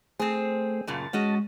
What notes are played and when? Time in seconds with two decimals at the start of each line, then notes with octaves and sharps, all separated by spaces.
0.20 A3 C4 G#4 C5
0.87 F#2 A#2 C#3 A5
1.13 G#3 C#4 F#4 D#5